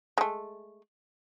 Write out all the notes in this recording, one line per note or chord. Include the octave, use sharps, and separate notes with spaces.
G#3 A3